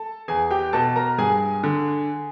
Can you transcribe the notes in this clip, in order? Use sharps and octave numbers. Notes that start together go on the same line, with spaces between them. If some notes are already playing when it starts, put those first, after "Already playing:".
Already playing: A4 A5
E2 G#4 G#5
G4 G5
B2 A4 A5
A#4 A#5
G2 G#4 G#5
D3